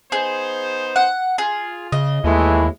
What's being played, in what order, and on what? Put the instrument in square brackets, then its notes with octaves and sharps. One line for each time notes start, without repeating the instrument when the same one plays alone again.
[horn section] B3 D#4 C5 [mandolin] G#4
[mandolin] F#5
[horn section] F4 [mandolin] G#4
[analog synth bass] C#3 [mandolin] D#5
[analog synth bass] D#2 [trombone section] E3 A3 E4 [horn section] G#3